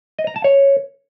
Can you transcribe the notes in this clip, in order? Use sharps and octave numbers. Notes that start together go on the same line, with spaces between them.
D#5
A#5
A5
C#5